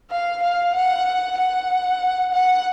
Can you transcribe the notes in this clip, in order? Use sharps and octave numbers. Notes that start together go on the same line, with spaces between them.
F5
F5
F#5
F#5
F#5